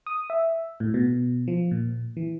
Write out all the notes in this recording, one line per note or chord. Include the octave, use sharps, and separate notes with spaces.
D#6
E5
A2
B2
F3
A#2
E3